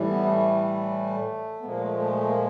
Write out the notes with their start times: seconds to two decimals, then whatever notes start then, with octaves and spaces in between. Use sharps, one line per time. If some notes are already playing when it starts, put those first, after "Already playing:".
Already playing: A2 E3 G3
0.10 B3
0.24 A3
1.61 B3
1.65 A#2 F3 G#3 A#3
1.81 A3
1.96 A3
2.12 A3
2.27 A#3